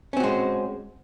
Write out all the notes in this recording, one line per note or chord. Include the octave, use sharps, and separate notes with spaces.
G#3 C4 C#4 F#4